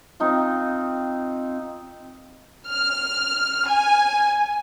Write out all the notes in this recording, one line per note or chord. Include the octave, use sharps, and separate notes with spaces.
C4 D#4 F4
F6
G#5